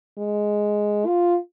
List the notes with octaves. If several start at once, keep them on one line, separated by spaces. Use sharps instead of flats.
G#3
F4